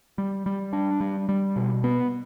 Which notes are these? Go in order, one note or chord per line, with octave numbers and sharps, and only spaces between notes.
G3
G3
D4
G3
G3
B2
B3